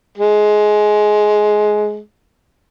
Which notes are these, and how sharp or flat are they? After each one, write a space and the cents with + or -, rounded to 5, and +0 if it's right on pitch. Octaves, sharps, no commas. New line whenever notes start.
G#3 +15